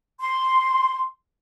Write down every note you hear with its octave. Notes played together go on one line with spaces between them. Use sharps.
C6